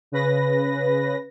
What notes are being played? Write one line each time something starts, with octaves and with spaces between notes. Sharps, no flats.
C#3 B4 A#6